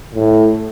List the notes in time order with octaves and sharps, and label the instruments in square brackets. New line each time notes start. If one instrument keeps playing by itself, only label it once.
[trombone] A2